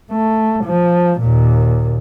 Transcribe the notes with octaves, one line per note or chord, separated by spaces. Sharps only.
A3
F3
D#2 A#2